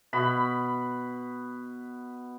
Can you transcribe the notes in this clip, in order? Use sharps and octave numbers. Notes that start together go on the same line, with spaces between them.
B2 B5